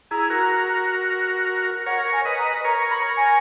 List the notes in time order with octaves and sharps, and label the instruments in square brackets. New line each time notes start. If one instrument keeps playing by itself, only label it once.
[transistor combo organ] E4 G#4 [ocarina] A#5
[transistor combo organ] F#4 A#4
[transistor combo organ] A#4 C#5 [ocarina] F#5
[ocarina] G#5
[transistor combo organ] B4 D#5
[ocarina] A#5
[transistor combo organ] A#4 C#5 [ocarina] A#5
[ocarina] B5
G#5